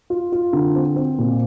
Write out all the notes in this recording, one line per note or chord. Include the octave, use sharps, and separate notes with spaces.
F4
F4
D3
C4
C4
A#2